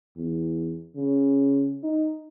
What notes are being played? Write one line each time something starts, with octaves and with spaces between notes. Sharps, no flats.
E2
C#3
D#4